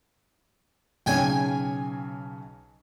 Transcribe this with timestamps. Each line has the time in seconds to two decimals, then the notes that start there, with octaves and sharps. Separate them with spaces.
1.06 B1 C#3 C#5 G5 G#5 G#6